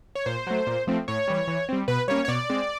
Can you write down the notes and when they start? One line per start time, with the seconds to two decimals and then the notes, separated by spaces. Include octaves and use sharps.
0.15 C#5
0.26 A#2 C5
0.47 F#3 A3
0.67 A#2
0.87 F3 A3 C4
1.08 A2 C#5
1.28 E3 G3
1.48 E3
1.69 G3 C4
1.88 B2 B4
2.08 G3 A#3 C#4 C#5
2.25 C#5
2.28 B2 D5
2.50 G#3 C4